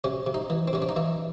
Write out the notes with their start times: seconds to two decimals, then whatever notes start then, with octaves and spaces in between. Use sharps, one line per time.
0.04 C3 C#4
0.26 C3
0.34 D#4
0.50 E3
0.68 C4
0.73 C3 C#4
0.82 D4
0.89 D#4
0.96 E3 E4